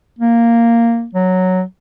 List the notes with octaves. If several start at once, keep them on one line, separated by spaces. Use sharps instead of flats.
A#3
F#3